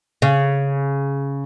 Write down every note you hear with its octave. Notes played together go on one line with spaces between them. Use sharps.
C#3